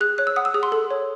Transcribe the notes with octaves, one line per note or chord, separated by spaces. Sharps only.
G#4 F#6
C#5 F#6
E6
F#5 D#6
E6
G#4 D#6
C6
A4
C#5